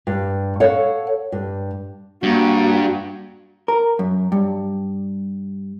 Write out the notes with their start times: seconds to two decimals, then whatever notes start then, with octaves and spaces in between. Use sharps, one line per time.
0.07 G2
0.60 A4 C#5 F5 F#5
1.32 G2
2.23 G2 A#3 F#4
3.68 A#4
3.99 F#2
4.32 G2